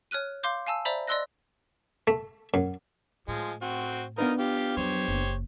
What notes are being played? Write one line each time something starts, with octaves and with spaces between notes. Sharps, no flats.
C#5 F6 F#6 D#7
F5 C6 D6 G6
F5 G#5 A5 E6
C5 D5 E5 A#5 B5
D5 D#5 C6 E6 F#6 A#6
A3
F#2
A2 F3 G#3
C4 F#4
B3 D4 D#4 F4 A#4 B4
F4 G4
F2 F#3 G4 C5 C#5
F#1